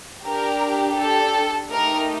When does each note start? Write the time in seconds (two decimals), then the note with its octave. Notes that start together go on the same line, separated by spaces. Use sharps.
0.25 D4 G4 A#4
0.97 A4
1.70 A3 D#4 G4 A#4